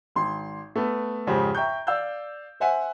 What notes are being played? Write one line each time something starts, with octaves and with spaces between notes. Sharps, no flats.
G#1 C6
A3 B3
F2 G#2 C#3 G4 C5
E5 G5 A#5 C#6 G6
D5 F5 E6 G6
C5 E5 F#5 G#5